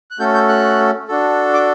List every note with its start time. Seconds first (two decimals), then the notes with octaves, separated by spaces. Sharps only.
0.11 F#6
0.19 A3 C#4 F#4 A4 G6
0.34 G6
0.49 F#6
1.08 D4 F#4 A4
1.54 D6